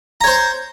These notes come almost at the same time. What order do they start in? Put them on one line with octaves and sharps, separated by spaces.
A#5 C#5 C5